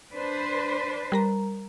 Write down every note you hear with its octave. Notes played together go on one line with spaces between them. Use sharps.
D4 B4 C5
G3 A#4 A#5